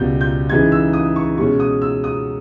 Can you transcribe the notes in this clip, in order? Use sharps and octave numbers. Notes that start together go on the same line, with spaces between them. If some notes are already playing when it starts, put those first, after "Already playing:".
Already playing: C#2 B2 G3 G6
G6
C#3 E3 G#3 D#4 G#6
E6
D#6
C#6
B2 G#3 C#4 C#6
D#6
E6
D#6